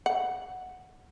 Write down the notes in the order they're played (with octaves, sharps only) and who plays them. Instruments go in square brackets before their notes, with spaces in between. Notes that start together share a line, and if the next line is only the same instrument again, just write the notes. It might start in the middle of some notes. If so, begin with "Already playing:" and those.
[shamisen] F#5